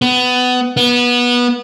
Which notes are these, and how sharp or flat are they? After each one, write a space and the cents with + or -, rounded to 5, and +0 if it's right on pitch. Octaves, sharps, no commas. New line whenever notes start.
B3 +20
B3 -20